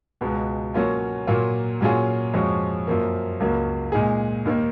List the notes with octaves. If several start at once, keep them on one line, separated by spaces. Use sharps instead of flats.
C#2 B2 G#3 B3
B2 F#3 A#3 C#4 F4
A#2 F#3 A#3 F4
A#2 F#3 C#4 F4 G#4
F2 F3 G#3 C#4 F#4
F#2 F3 A#3
C#2 C#3 F#3 A#3
A#2 G#3 D#4 G#4
D#2 D#3 A#3